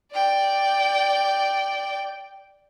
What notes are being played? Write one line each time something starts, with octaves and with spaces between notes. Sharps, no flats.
D5 G5